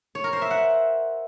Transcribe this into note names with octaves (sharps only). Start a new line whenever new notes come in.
C#5
A#4
C5
E5
F#5